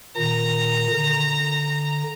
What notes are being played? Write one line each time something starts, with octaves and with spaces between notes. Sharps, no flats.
A#2 D#3 A#5
D3